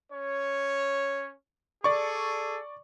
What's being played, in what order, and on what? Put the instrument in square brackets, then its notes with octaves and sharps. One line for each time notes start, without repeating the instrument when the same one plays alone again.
[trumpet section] C#4 C#5
[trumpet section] G#4 A4 [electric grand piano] D5 C#6